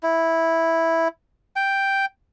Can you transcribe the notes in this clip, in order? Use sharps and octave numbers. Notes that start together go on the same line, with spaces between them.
E4
G5